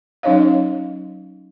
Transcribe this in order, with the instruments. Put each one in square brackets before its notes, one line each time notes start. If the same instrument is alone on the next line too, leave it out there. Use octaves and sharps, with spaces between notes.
[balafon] F#3 C#4 D#4 C#5 D#5 F5